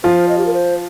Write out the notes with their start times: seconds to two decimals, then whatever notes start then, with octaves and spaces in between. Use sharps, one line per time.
0.03 F3 F4 C5
0.28 D#5
0.37 G4
0.46 A#4
0.53 C5